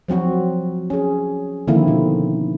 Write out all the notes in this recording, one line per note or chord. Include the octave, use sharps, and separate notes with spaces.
F3 F#3 C4 F#4
C#4 G#4
D3 D#3 F3 A#3 C4 E4
B2